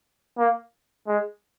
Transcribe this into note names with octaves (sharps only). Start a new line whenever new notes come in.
A#3
G#3